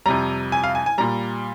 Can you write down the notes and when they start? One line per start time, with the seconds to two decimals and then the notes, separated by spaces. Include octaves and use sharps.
0.06 F2 C3 G3 A#5
0.52 G#5
0.63 F5
0.75 G#5
0.86 G#5
0.98 A#2 G3 A#5